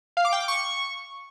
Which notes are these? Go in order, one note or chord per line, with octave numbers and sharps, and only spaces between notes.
F5
D6
G5
D6
C#6